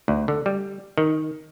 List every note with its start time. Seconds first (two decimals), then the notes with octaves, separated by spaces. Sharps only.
0.08 D2
0.28 D3
0.46 G3
0.98 D#3